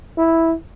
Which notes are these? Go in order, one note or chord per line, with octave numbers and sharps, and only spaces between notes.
E4